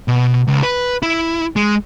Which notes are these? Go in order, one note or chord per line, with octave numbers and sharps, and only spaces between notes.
B2
C#2
B4
E4
G#3